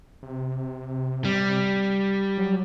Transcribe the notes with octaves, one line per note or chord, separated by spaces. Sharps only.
C3
G3
F#3